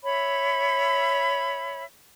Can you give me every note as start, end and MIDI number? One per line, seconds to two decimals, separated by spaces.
0.03 1.84 73
0.03 1.84 76
0.03 1.84 83